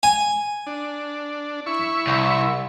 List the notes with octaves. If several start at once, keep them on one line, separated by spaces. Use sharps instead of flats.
G#5
D4
E4 C#6
C2